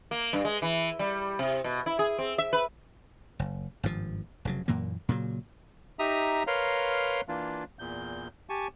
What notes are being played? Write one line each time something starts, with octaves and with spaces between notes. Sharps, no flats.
A#3
G2
G#3
E3
G3
C3
B2
E4
G#4
C4
E5
B4
F#1
G#1 G2 A#2 F3
F1 C#3 F#3
F#2 A#2 E3 A#3
A#2 C#3 E3 F#3
D#4 G4 E5 A#5 D#6
A#4 B4 C#5 F5 A#5 C6
E3 A#3 D4 F4
E2 A#2 G6
G4 G#5 A5 C#6